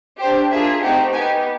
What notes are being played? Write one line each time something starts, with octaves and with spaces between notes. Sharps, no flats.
D4 G4 C5
A#3 D4 F4 G#4 E5
A3 C4 D#4 G4 F#5
B3 D#4 G4 G#5